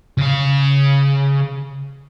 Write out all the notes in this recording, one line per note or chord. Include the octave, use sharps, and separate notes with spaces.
C#3 F5